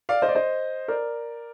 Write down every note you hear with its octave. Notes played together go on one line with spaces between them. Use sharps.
D5 F5
C5 D#5
D5
C5 D#5
A#4 D5